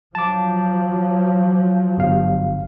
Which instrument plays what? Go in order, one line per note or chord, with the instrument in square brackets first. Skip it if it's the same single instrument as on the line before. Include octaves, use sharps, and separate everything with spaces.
[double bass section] F3 F#3 [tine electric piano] A5 D6
[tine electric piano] G1 F5